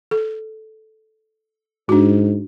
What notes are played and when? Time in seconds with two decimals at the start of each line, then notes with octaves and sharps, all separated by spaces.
0.11 A4
1.89 G#2 D4 F#4